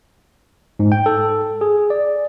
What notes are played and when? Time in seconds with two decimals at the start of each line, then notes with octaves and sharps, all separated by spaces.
0.79 G#2
0.92 G5
1.06 A4
1.61 G#4
1.90 D5